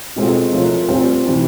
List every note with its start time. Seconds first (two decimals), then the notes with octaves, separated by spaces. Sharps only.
0.16 B2 G#3 C4 F4 A4
0.52 F3 A3 C#4 F4 A#4
0.89 G3 C4 F4
1.26 C3 E3